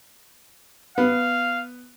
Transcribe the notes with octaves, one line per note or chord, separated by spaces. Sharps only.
B3 F5